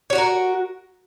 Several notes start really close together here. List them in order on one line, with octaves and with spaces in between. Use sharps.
C#5 F#4 F#5 A#4